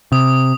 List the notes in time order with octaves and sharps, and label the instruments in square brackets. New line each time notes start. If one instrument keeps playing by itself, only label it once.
[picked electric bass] C3 [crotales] D#6